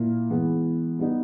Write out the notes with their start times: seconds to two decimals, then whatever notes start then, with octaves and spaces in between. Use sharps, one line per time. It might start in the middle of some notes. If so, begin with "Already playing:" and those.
Already playing: A#2 A#3 E4
0.30 E3 G#3 B3
0.99 G3 B3 D#4